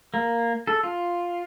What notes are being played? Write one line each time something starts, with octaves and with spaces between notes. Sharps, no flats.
A#3
A4
F4